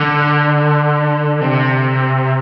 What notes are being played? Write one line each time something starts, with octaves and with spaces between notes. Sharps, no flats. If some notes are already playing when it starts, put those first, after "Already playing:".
Already playing: D3
C3